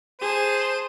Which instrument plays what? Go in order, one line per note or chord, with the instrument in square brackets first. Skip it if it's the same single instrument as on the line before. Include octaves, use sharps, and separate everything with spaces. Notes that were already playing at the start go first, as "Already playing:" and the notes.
[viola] G#4 [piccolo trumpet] C5 [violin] A5 D#7